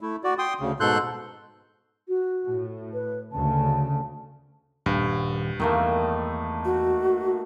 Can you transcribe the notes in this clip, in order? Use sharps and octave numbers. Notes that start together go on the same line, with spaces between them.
A3 E4
F#4 D5
G5 C6 D#6
D2 C#3
G#2 B2 A4 C6 F#6 G6
F#4
A2
B4
D2 C#3 A5
D#1 G2
E2 D#3 A3 A#3
F#4